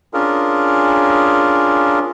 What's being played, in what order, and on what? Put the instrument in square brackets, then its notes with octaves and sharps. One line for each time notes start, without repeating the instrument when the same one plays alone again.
[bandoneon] C#4 D4 F4 G#4 A#4